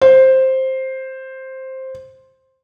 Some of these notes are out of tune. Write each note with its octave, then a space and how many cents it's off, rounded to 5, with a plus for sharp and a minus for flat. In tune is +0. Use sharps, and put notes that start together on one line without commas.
C5 +5